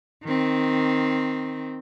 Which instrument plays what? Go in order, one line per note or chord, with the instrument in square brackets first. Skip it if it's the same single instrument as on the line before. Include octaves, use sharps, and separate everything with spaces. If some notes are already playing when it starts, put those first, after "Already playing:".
[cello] D#3 C4